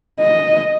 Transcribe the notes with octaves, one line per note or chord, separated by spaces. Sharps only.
D#5